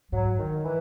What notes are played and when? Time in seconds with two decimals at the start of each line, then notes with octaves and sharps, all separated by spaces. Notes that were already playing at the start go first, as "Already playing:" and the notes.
0.12 G#2 F#3
0.38 D#3
0.64 E3